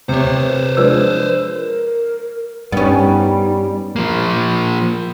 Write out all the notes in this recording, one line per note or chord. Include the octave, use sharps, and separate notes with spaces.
C3 C5 C#5
F3 G#3 D4 B4 D5 E6
A#4
G2 G3 B3 C#4 D#4
F3 A#3